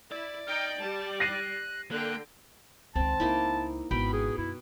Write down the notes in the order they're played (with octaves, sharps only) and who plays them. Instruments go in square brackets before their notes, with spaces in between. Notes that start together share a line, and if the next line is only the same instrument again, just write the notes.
[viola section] E4 [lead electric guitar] D5
[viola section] D#4 G5 [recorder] F6
[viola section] G3 [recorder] A5
[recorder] F#6 [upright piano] A#6 C7 D#7
[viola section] D3 G5 [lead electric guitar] A#3 [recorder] F#6
[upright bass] C#2 D#3 [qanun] C4 [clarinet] A5
[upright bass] C#2 [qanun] A#3 D#4 E4
[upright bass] G#1 [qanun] B2 G5 [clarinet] B5
[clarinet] G#4
[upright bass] F#2 [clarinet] E4